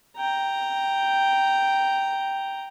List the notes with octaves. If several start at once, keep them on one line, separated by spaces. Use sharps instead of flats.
G5 A#5